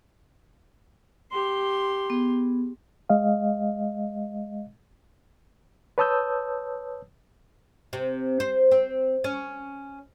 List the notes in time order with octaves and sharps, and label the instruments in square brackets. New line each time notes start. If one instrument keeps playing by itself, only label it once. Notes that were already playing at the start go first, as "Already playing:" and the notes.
[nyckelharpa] G4 C6
[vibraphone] B3 G#4
[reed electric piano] G#3 D#5 F5
B4 C#5 A5 D#6 E6 G6
[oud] C3
C5
C4
C#4